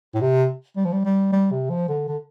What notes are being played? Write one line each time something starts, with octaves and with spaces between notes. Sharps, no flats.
A2
C3
G3
F3
G3
G3
G3
C3
F3
D3
D3